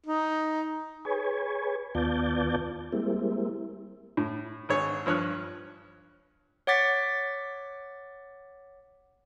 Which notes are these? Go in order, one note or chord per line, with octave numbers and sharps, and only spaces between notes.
D#4
G#4 B4 C#5 G#5
D#2 B3 F4 D5 A5 G6
G3 G#3 A#3 C4 E4
A2
G#1 G#4 C#5
G2 F3 C#5 F6 F#6
C#5 F#5 D6 A6 B6